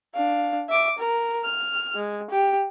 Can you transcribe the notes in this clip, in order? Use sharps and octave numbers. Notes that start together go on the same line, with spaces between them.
D4 F5
E5 D6
A#4
F6
G#3
G4